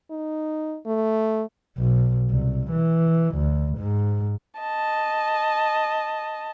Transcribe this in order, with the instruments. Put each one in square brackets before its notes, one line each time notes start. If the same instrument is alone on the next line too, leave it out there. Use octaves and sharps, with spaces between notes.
[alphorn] D#4
A3
[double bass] B1
C2
E3
D2
G#2
[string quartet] D#5 A5